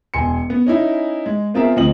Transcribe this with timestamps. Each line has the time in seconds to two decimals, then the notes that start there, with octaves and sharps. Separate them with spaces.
0.14 E1 G#5 C6 C#7
0.50 B3
0.67 C#4 D#4 E4
1.26 G#3
1.54 B3 C4 F4 G#4 A#4 E5
1.76 D2 F3 C4 D#5 F#7